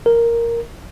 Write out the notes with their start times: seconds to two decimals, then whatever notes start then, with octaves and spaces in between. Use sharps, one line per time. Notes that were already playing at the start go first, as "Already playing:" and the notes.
0.06 A#4